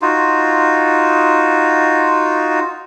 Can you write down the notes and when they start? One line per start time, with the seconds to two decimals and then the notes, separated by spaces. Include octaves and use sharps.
0.02 D#4 F4 F#4